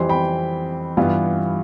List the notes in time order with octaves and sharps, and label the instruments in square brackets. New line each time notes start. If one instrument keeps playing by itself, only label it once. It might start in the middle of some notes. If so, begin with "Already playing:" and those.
Already playing: [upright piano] F2 E3 G3 C4 C6
G5 B5
G2 E3 G3 B3 F4